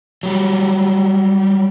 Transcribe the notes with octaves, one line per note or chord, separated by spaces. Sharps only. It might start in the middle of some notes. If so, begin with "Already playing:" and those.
F#3 G3